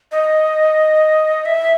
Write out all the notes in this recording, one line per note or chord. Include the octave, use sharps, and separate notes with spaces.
D#5
E5